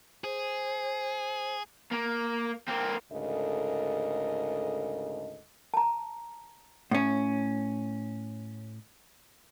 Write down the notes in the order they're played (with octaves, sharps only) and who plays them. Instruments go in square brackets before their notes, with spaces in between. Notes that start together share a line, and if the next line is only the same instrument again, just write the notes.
[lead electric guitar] G#4 [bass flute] C5
[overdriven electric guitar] A#3
A#3 C4
[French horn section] D2 G#2 C#3 A4 A#4 D#5
[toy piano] A5 A#5
[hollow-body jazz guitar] A2 C#4